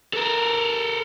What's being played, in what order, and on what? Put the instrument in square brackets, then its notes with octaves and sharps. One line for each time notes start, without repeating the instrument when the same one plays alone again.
[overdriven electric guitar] A4 A#4